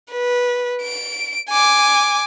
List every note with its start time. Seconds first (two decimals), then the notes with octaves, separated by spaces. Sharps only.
0.12 B4
0.82 D7
1.49 G#5 D6